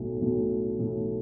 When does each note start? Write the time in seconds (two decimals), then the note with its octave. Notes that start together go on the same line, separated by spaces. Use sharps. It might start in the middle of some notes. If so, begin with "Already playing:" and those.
Already playing: B1 A2 A3 F#4
0.21 B1 A2 A3 F#4
0.78 B1 A2 A3 F#4